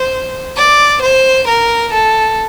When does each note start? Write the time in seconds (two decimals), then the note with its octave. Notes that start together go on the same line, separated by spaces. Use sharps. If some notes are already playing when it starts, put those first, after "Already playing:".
Already playing: C5
0.57 D5
1.03 C5
1.48 A#4
1.93 A4